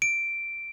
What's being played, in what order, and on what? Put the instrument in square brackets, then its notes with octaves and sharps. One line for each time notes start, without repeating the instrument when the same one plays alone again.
[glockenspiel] D7